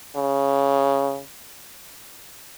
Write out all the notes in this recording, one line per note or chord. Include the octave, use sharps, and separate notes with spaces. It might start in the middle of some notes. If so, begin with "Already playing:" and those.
C#3